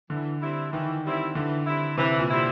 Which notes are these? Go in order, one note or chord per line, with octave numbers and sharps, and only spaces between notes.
D3 E3
G3 C4 E4
D#3 E3
G3 C4 E4
D3 E3
G3 C4 E4
C3 E3
A#2
G3 C4 E4